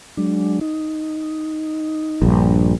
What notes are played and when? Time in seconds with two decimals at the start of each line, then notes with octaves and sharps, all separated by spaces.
0.17 F#3 G#3 D4
0.61 D#4
2.22 A#1 G2